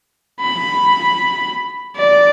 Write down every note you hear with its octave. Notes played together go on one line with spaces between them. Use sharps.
B5
D5